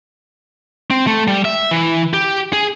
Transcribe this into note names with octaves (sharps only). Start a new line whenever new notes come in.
C4
A3
G3
E5
E3
G4
G#4